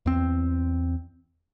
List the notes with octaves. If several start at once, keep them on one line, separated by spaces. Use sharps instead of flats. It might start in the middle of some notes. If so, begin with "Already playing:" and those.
E2 C4